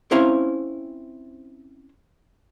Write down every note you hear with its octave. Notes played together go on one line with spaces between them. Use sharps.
C4 C#4 E4 C5 F5 A#5